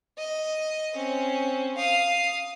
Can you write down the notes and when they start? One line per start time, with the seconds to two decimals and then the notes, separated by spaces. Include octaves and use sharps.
0.18 D#5
0.93 C4 C#4
1.76 F5 D#6